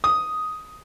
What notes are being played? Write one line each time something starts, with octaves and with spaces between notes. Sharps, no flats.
D#6